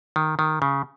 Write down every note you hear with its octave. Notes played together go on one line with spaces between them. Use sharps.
D#3
D#3
C#3